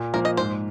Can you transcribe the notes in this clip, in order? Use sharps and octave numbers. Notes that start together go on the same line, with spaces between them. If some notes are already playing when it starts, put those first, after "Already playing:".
Already playing: A#2
F3 A#3 A#4
D#5
G#2 C5